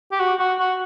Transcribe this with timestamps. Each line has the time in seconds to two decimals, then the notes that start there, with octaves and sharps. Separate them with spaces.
0.12 G4
0.20 F#4
0.39 F#4
0.60 F#4